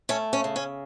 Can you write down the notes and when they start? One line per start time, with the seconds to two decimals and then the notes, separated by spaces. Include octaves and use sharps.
0.09 A3 C#4
0.33 C#4
0.44 C#3
0.56 C#4